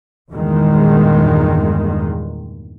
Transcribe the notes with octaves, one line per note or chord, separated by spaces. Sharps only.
E2 G2 A#2 D#3 G#3